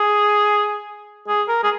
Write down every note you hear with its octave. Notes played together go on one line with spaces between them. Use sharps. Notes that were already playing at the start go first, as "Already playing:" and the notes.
Already playing: G#4
G#4
A#4
G#4